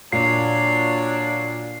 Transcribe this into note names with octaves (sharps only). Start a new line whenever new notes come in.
A#2 F#3 D4 C#5 C7